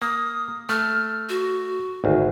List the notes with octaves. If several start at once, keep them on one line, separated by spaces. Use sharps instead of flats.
A#3 D#6
A3 F6
F#4
G#1 D2